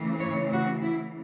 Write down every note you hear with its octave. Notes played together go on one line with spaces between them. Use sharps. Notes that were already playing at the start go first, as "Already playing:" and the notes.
Already playing: C#3 E3 A3
C#5
F#4
E4